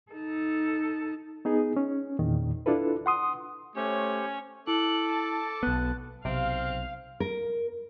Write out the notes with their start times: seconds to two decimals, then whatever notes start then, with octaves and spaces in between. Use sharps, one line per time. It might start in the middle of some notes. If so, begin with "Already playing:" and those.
0.12 D#4 A4
1.45 B3 D#4 G#4
1.77 C#4
2.19 E2 A#2 D#3
2.66 D4 E4 F4 A4 B4
3.06 F#5 C6 D#6
3.76 A3 C#4 G4 C5 C#5
4.67 E4 A4 D6 F#6
5.12 A5
5.63 B1 B3 F#6
6.25 B1 C3 C4 F5
7.20 A#4